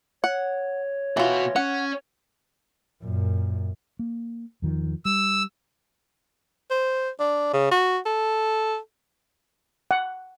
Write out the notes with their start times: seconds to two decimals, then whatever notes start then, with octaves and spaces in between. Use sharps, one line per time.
0.24 C#5 F#5
1.17 B2 E3 F4 F#4
1.56 C#4 F#5
3.03 F#2 A#2
3.99 A#3
4.62 E2 D#3 F3
5.05 G3 E6
6.71 C5
7.20 D4
7.53 C#3
7.71 F#4
8.05 A4
9.91 F#5